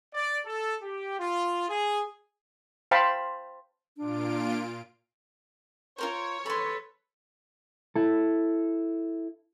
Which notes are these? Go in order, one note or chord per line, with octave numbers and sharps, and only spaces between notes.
D5
A4
G4
F4
G#4
C5 F5 G5 A5 B5 C6
A#2 D4 F4 D7
F4 A#4 C5 C#5
A4 B4 B5 C6
E4 A4